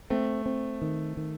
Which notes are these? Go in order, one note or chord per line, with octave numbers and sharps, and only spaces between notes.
A3 C4
C4
D#3
D#3